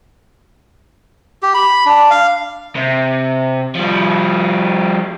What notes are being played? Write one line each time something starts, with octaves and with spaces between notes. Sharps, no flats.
G4
B5
D4
F5
C3
F3 G3